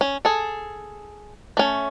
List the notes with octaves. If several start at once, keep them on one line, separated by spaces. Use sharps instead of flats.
C#4
G#4 A4
A3 C#4